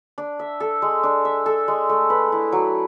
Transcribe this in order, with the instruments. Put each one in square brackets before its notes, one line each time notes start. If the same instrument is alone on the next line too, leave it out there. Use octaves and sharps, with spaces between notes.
[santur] D4
E5
A4
G#3
D4
E5
A4
G#3
A3
B4
E4
F#3